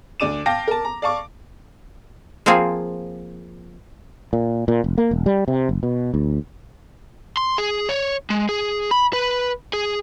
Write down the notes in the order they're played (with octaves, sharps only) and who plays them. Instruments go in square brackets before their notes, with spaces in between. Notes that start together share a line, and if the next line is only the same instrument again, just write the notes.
[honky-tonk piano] D2 D4 D5 D6 D#7 E7
F5 G5 A5 D6 A#6
A#4 A5
A#5
D5 F5 A5 C#6 D6
[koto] F3 A#3 C4 F4 G#4
[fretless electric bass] A#2
A#2
F1
A#3
E1
G3
C3
F#1
B2
D2
[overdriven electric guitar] C6
G#4
C#5
G#3
G#4
B5
B4
G#4